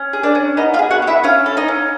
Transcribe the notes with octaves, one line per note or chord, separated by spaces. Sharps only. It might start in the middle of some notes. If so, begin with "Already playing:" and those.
Already playing: C#4
G#4
D4 D5
C#4
B3 D#4 D#5
F4 F5
G#4
F#4 F#5
B3
E4 E5
C#4 F4 F5
A4
D#4 D#5
C#4